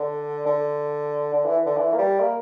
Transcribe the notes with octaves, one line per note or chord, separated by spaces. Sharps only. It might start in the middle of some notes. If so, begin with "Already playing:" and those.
Already playing: D3
D3
D3
E3
D3
E3
A#3
G3
A#3